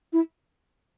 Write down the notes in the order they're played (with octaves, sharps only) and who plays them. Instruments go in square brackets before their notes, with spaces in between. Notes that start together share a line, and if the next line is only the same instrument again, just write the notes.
[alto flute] E4